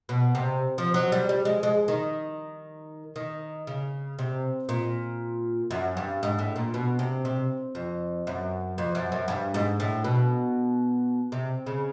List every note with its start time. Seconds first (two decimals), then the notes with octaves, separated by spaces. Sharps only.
0.09 B2
0.35 C3
0.78 F3
0.94 F#3
1.12 G3
1.29 G3
1.45 G#3
1.63 G#3
1.88 D#3
3.16 D#3
3.67 C#3
4.19 C3
4.69 A#2
5.71 F#2
5.97 G2
6.23 G#2
6.39 A2
6.56 A#2
6.74 B2
6.99 C3
7.25 C3
7.75 F2
8.27 F#2
8.78 F2
8.95 F#2
9.12 F#2
9.28 G2
9.54 G#2
9.80 A2
10.04 B2
11.32 C3
11.66 C#3